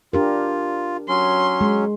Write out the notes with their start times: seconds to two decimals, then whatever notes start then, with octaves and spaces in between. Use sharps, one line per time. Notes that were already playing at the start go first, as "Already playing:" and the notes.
0.13 D4 F4 G4 A#4
1.08 F#3 C#4 C6
1.61 G#3